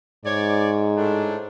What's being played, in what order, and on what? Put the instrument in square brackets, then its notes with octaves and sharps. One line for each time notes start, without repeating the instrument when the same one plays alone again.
[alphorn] G#2 [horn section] C#5 D5
[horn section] A2 A3 D4